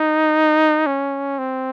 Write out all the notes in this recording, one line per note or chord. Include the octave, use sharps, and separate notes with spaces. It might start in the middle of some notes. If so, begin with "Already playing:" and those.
Already playing: D#4
C#4
C4